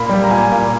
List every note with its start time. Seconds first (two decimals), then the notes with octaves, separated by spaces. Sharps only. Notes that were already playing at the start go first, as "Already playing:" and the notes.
Already playing: A#2 A#3 B5
0.09 G3
0.24 A#5
0.31 A#2 G#5
0.52 A#2